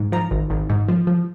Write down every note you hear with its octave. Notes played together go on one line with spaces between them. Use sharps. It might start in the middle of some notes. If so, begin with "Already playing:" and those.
Already playing: G#2
F3 A#5
G#1
G#1
G#2
F3
F3